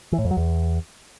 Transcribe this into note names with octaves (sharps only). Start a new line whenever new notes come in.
E3
A2
F2
F#3
E2